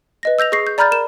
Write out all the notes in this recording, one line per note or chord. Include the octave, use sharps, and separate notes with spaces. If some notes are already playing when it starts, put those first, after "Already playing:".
B4 D#5 A#6
E6 G6 A#6 F7
G#4 C#6 A#6 C7
G6
D5 A#5 B5 F6 G6 A6
A#4 E7